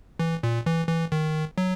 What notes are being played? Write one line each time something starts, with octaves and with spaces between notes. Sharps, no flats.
E3
A#2
E3
E3
D#3
F#3